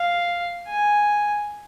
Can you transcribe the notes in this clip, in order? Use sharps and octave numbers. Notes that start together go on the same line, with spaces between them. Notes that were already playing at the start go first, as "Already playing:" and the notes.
Already playing: F5
G#5